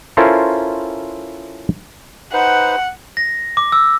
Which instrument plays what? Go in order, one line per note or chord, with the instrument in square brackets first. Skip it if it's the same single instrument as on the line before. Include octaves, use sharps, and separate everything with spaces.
[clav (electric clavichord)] C#4 E4 F4 A4 A#4 C5
[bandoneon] D#4 B4 C5 [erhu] F#5
[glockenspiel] A#6
D6
E6